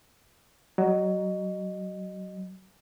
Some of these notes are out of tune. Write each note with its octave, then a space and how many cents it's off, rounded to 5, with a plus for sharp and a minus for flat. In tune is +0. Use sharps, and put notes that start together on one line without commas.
F#3 +20 D#5 -15